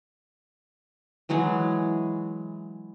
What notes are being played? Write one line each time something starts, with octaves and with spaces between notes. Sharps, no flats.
E3 F#3 G#3 G#4